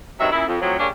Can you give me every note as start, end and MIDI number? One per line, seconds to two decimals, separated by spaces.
0.20 0.28 43
0.20 0.28 48
0.20 0.28 51
0.20 0.28 54
0.20 0.28 76
0.32 0.43 46
0.32 0.43 49
0.32 0.43 64
0.47 0.59 41
0.62 0.76 45
0.62 0.76 48
0.62 0.76 53
0.62 0.76 54
0.79 0.88 49
0.79 0.88 55
0.79 0.88 58
0.79 0.88 61
0.79 0.88 62